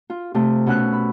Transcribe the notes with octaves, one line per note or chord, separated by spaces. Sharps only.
F4
C3 A3 F4
B2 C#4 F#5 E6 F#6
B5